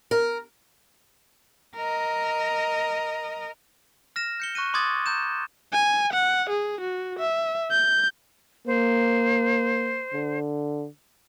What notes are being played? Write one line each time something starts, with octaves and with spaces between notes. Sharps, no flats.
A#4
A#4 D#5
F6 A#6 E7
G6 C#7 G7
C#6 F#6 A#6 D#7
C6 D6 D#6 G#6 A6
A#5 G6 E7
G#5
F#5
G#4
F#4
E5
G6
A#3 C5
D3